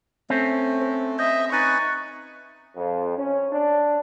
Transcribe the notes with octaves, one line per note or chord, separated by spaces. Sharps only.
A3 C4 C#4
C5
D#5 E5 G6
D#4 B4 G#5 C#6 F#6 A6 A#6
F2
C#4
D4